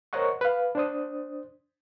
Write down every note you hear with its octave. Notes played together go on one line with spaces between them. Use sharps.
A#4 C5 C#5 D#5 F#5 C#6
B4 F5
D4 C5 D#6